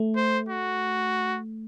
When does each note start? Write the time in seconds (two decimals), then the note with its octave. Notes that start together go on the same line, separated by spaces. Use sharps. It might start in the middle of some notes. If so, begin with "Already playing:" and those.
Already playing: A3
0.17 C5
0.49 F#4